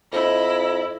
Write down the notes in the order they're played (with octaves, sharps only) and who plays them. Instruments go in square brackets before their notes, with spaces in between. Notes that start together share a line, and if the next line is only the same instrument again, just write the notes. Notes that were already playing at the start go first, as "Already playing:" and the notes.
[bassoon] F2 [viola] E4 [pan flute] D#5